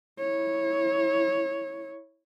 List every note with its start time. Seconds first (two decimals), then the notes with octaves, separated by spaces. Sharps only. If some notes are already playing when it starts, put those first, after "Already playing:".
0.19 E4 C#5